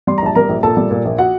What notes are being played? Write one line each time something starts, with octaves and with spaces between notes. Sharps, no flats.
G3 C6
A#5
A#1 A5
G3 A#4 A#5
A#1
A#2 A4 A5
G3
A#2
A#1
F#4 F#5